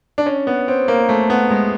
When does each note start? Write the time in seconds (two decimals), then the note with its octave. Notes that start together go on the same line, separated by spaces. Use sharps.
0.18 D4
0.26 C#4
0.47 B3
0.68 C4
0.88 A#3
1.09 A3
1.30 B3
1.50 G#3